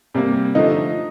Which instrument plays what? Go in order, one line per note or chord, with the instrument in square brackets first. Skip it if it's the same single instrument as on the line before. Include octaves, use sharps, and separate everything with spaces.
[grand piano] C3 G3 A#3
[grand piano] D3 F3 A3 [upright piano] D#4